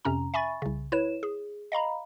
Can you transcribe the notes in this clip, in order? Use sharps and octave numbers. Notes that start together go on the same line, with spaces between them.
F2 C3 C#4 A#5
E5 G#5 B5 C#6 A6
C2 C#3
E4 B4 C#5 E7
G#4
D#5 F5 A#5 B5